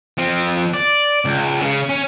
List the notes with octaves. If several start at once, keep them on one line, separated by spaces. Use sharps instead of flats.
F3 C4
D5
C#2
C#3
C#4